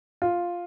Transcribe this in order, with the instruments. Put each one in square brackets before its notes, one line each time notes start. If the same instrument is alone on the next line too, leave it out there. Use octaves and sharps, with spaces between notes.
[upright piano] F4